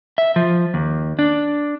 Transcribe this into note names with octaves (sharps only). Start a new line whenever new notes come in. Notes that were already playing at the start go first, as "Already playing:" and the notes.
E5
F3
D#2
D4